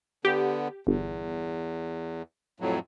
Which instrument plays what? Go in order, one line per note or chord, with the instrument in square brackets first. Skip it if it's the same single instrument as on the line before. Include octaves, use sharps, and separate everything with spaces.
[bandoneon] D3 B3 [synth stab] G4
[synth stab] G1 [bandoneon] E2
[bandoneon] F2 A2 F#3